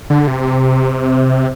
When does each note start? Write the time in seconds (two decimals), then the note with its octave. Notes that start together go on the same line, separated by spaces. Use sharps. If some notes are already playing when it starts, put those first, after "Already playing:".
0.10 D3
0.27 C3